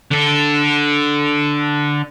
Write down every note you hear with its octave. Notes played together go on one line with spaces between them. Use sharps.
D3 A4